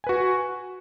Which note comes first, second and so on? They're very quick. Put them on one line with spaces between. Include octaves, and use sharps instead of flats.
G#5 B4 F#4